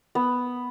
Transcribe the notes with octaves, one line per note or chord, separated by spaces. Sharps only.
B3